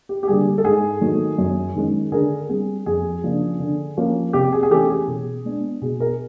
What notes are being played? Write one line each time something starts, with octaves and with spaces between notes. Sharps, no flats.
G4
G4
D3 G3 A#3 G#4
A4
G#2 G#4
D#3 F#3 A3
F#2
D#3 G#3 C#4
D3 G#4 A#4
G3 C4 G#4
F2 G#4
C#3 F3 A#3 D4
D3
F3 A#3 C#4
C3 G4
G#4
G#4
E3 A3 C#4 G4 A4
G#4
B2
G#3 B3 D4
B2 G#4
G#4 A#4